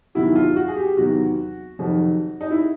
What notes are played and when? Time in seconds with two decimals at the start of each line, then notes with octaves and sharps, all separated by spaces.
0.15 E2 C3 D#3 F#3 E4
0.36 F4
0.56 F#4
0.68 G#4
0.77 G4
0.97 E2 C3 D#3 F#3 F#4
1.79 F2 C3 D#3 F#3
2.41 D#4
2.51 E4